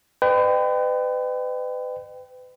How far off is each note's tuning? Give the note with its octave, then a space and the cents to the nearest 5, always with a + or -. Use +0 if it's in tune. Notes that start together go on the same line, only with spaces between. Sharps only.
B4 +40 D#5 -45 G5 +0